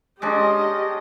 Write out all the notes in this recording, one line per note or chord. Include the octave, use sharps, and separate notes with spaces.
G#3 C#4 D4 G4 D#5